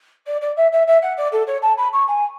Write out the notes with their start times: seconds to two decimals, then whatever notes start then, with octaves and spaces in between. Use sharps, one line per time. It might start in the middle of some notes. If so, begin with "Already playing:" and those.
0.26 D5
0.41 D5
0.57 E5
0.72 E5
0.87 E5
1.02 F#5
1.17 D5
1.32 A4
1.47 C#5
1.62 A5
1.77 B5
1.93 C#6
2.07 G#5